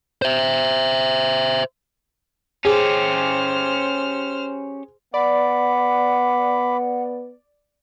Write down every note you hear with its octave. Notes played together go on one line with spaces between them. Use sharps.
C5 E5
C#4 G4 G#4 C5 F6
B3 D5 F#5 B5 D6